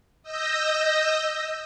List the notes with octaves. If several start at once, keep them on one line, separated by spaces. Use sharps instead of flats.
D#5 E6 G6 A#6